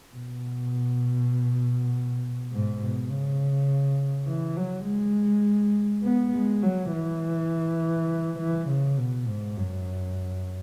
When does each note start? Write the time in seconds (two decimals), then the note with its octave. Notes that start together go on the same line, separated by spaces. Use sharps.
0.16 B2
2.51 G#2
2.80 B2
3.09 C#3
4.27 E3
4.57 F#3
4.86 G#3
6.03 B3
6.33 G#3
6.62 F#3
6.92 E3
8.39 E3
8.68 C#3
8.97 B2
9.27 G#2
9.57 F#2